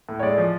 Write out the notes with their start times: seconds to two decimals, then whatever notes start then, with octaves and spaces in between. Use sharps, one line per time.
0.09 A2
0.20 C#5
0.23 G#3 D5
0.38 F3